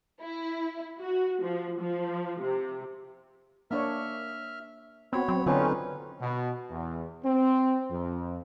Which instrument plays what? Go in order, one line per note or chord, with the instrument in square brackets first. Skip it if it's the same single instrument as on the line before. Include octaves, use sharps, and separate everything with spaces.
[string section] E4
F#4
F3
F3
C3
[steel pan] A#3 D4 C#5 [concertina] E5 F6
[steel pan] B3 F#4 [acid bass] C4 [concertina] C#5 B5
[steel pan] F#3 [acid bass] C4
[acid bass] D3 [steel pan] C4 F4 [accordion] C#4 [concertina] D#4 B4
[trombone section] B2
E2
C4
F2